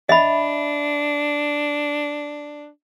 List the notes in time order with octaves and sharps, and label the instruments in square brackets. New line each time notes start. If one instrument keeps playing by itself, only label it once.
[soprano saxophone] D4 [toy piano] D#5 E5 B5